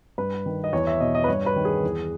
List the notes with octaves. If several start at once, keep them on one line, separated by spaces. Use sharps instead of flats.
G2 B4
D#3
D#5
E2 C#5
E5
B2 D#5
D#5
B4
G2 C#5
B4
D#3
G#4
E2